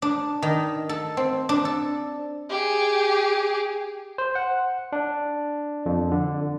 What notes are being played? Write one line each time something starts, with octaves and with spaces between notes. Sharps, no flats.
D4
D#3
A4
C4
D4
A4
G4 G#4
C5
F#5
D4
F2
D3